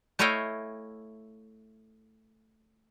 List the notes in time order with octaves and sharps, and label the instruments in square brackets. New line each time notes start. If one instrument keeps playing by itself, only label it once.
[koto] A3 E4 C#5 D#5 F5 G5